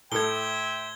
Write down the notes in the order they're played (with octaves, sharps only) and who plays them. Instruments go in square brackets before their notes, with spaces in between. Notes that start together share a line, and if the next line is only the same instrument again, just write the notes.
[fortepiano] A2 A4 [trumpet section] C5 E5 G5 [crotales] G#6 G7